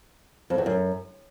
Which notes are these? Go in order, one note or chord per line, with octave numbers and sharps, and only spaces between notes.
F2
E2
F#2